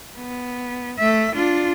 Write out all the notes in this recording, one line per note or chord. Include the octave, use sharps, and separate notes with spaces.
B3
A3 E5
D4 F4